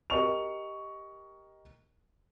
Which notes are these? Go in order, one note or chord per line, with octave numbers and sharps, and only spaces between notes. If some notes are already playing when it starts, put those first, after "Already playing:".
G4 A#4 D#5 C#6 F7